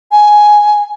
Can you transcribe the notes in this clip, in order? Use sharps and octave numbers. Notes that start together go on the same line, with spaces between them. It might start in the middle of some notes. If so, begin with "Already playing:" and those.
G#5